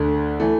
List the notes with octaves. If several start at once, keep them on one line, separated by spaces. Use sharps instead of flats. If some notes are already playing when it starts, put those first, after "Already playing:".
Already playing: D2 D3 A3
E3 A3